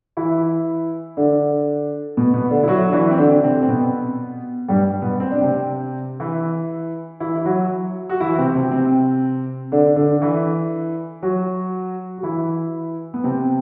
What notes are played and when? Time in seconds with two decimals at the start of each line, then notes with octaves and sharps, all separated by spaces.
0.17 E3 E4
1.17 D3 D4
2.17 B2 B3
2.34 B2 B3
2.51 D3 D4
2.63 E4
2.68 F#3 F#4
2.89 D4
2.93 E3 E4
3.11 C4
3.18 D3 D4
3.43 C3 C4
3.62 C4
3.68 B2 B3
4.68 G2 G3
5.02 B2 B3
5.20 C4
5.31 D4
5.42 C3 C4
6.20 E3 E4
7.20 E3 E4
7.36 E4
7.45 F#3 F#4
8.09 F#4
8.20 E3 E4
8.38 C3 C4
8.55 C3 C4
8.71 C3 C4
9.72 D3 D4
9.96 D3 D4
10.22 E3 E4
11.22 F#3 F#4
12.18 F#4
12.23 E3 E4
13.14 B3
13.24 C3 C4